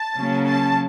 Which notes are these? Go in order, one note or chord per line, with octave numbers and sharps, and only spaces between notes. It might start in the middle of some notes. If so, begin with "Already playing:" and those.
Already playing: A5
C#3 F#3 A#3 C#4
A5